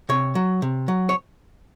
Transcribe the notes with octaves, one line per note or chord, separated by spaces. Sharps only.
C3 C#5
F#3
C3
F#3
C#5